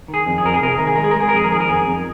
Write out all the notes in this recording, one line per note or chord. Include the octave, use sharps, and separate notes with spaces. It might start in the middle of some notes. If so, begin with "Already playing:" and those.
D#3
G#4
F2
G#4
F2 A#4
G#4
C3 A#4
G#4
D#3 A#4
G#4
G#3 A#4
G#4
A#4
G#3
G#4
A#4
F2 G#4
A#4
D#3 G#4
A#4
F2 G#4
F2